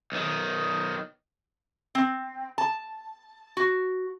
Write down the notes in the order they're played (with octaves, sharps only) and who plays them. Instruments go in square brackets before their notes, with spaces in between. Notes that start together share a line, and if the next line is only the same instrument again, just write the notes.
[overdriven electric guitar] B1 D#3
[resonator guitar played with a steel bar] C4
A5
F#4